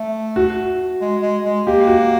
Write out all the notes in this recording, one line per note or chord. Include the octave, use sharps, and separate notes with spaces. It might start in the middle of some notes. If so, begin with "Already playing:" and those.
Already playing: A3
F#4
G#3
G#3
G#3
A#3 G4
F#4